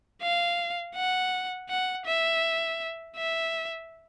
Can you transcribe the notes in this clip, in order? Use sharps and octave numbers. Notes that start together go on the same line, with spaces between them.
F5
F#5
F#5
E5
E5